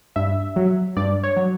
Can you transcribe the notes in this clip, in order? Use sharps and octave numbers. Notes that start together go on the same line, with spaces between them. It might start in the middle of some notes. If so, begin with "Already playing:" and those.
G2 E5
F#3
G2 D5
C#5
F#3